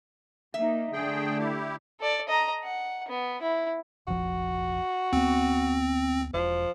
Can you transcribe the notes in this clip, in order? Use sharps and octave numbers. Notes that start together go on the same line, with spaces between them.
A#3 D#4 E5
D3 A3 G#4 G5
E4 G4
A4 D5
D#5 A#5
F#5
B3
E4
F1 A#1 F3 F#4
D2 B3 C4
E1 F3